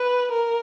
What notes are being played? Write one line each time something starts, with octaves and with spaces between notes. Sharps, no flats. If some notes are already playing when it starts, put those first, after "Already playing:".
Already playing: B4
A#4